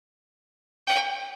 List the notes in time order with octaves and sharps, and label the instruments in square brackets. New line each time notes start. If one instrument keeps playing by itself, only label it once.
[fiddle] G5